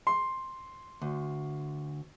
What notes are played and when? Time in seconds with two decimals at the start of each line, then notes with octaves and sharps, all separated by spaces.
0.07 C6
1.02 D2